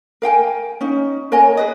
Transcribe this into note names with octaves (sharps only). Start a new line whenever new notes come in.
A#4 F5 G5 G#5
C#4 D#4
A#4 C#5 D#5 G#5
G#4 B4 D#5